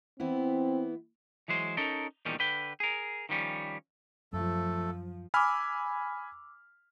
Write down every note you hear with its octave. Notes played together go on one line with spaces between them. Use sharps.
E3 B3 C4 E4
E3 F#3 G#3 C5
C#4 D#4 A4 A#4
E2 A#2 D#3 G3 C#4
D3 B4 G5
G#4 A#4
D#3 F3 G3 C#4
F#2 F3 A3 A4
G#5 B5 D6 E6 F6